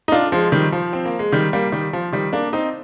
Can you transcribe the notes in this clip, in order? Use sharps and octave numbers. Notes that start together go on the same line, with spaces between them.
D#4
D4 F4
F3 G#3
D#3 G3
F3
C4
A#3
G#3
D#3 G3
G3 A#3
D#3 G3
F3
D#3 G3
A#3 D4
C4 D#4